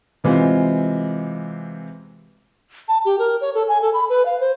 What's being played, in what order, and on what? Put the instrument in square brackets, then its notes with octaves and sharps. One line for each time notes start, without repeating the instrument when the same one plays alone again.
[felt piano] C3 E3 G#3 C4 F4
[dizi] A5
G4
A#4
C#5
A4
G#5
A4
B5
B4
F5
C5